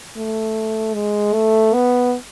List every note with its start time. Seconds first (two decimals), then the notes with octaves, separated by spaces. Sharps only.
0.16 A3
0.94 G#3
1.34 A3
1.74 B3